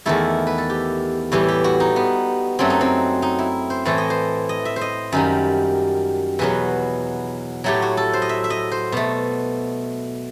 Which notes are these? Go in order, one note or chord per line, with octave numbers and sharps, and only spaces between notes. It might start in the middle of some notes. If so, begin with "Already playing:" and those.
E2 D#3 A3 E4
B4
A4
G4
A2 E3 G3 G4
G4
F#4
D#4
B3
F#2 F#3 A3 C4
D#4
C4
D#4
E4
C5
A2 E3 A3 C5
D#5
C5
D#5
E5
C5
D#5
F#2 D#3 G3
E2 B2 F#3 B4
A2 F#3 A3 G4
F#4
A4
C5
D#5
E5
E5
D#5
C5
B2 A3